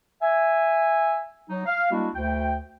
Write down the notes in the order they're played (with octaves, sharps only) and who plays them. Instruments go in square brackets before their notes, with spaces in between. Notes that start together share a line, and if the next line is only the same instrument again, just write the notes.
[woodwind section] E5 G#5
F#3 D#4
F5
G3 G#3 A#3 D4 E4 F#4
D2 G5